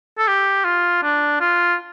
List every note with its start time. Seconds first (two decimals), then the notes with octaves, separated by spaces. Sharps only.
0.18 A4
0.28 G4
0.65 F4
1.03 D4
1.41 F4